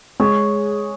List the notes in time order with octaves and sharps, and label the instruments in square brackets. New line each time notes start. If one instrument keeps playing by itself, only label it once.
[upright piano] G#3 [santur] C#5